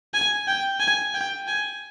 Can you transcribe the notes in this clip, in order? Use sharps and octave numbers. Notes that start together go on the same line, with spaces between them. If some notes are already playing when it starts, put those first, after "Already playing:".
G#5
G5
G#5
G5
G#5